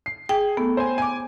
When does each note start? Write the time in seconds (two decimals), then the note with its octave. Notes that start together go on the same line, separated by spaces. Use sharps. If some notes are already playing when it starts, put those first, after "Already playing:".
0.06 C7
0.29 G#4 G5
0.57 A3 B3
0.77 C5 G#5
0.98 G#5 D6